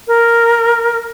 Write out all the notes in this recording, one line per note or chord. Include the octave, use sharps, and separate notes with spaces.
A#4